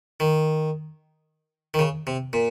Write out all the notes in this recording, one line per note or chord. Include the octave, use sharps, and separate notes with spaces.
D#3
D#3
C#3
C3
A#2